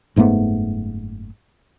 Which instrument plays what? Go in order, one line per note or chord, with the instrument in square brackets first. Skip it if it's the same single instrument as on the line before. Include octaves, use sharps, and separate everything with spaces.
[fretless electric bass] F#1 G#2 A3 B3